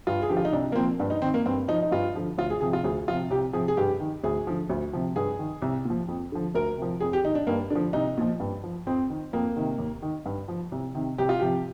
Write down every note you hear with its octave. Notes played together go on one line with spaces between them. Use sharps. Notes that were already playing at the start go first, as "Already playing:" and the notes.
G2 F4
G#4
D3 F3 G4
F4
D#4
C2 D4
A#3
A#2 F3 C4
G2 D4
D#4
D#3 C4
A#3
G2 C4
F3 D#4
D#4
G2 F4
D3 F3
D2 F4
G#4
C3 F3 G#4
F4
D2 G#4
C3 F3 F4
C2 G4
C3 F3 G#4
G#4
G2 G4
D#3
D2 G#4
D3 F3
D2
C3 F3
G2 G#4
D#3
C2
A#2
F3
F2
D3 F3
D2 A#4
C3 F3
F2 G#4
G4
D#3 D#4
D4
G2 A#3
D3 F3 D4
C2 D#4
A#2 F3
G2
F3
F2 C4
D#3
F2 A#3
C3 D#3
D#2
D#3
G2
F3
C2
C3 D#3
C2 G4
F4
C3 F3 G4